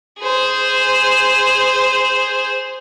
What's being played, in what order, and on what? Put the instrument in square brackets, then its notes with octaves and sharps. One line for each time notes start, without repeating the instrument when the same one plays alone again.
[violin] G#4 C5